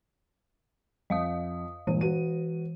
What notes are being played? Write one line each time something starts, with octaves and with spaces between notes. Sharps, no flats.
F2 D#5 F5 D#6
G1 A#2 E3 D#7
F#4 B4 D#7